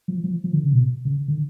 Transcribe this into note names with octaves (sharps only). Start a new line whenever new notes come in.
F3
F3
F3
D3
C#3
B2
C#3
D3